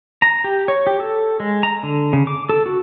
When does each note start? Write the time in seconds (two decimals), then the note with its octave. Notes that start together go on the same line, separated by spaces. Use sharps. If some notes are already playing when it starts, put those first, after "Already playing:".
0.22 A#5
0.44 G4
0.68 C#5
0.87 G4
1.00 A4
1.40 G#3
1.63 A#5
1.83 D3
2.13 C#3
2.27 D6
2.49 A4
2.66 F#4